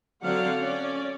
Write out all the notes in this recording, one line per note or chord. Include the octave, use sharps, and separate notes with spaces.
D3 F#3 C4 D5 F5 F#5
C#4 D5